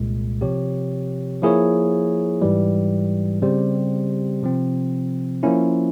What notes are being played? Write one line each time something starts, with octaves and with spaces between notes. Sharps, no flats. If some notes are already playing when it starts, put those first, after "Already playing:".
Already playing: C2 A#2 G#3
C3 F3 C4 G4 C#5
F3 A#3 E4 G#4 C#5
G#2 E3 G3
C#3 G3 C4 G4 C5
C3 F3 C4
F3 A#3 C#4 E4